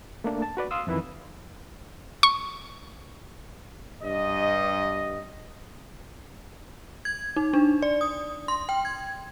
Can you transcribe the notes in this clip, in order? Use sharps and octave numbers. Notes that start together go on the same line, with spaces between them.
A3 A#3 D4
A5
F#4 B4 D5
F5 C6 D#6 E6
F2 D#3 E3 E4 B4 E5
C#6
G2 D#5
G#6
D#4
D4
D5
D#6
C6
G5
G#6